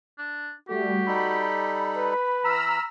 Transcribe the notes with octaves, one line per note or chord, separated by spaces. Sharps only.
D4
G3 A3 F#4 G4
G3 D#4 A4 B5
B4
E3 A#5 B5 E6 F6